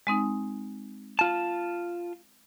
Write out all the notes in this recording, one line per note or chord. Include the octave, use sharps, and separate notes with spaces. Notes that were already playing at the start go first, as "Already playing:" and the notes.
G#3 C4 D#4
F4 A5